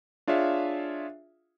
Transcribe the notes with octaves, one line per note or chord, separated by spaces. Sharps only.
D4 F4 G#4 C#5 E5 F5